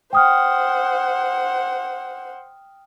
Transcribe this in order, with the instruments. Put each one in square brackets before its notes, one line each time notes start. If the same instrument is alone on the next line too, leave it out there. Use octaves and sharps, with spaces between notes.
[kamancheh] C5 F#5 [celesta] G5 D#6 F6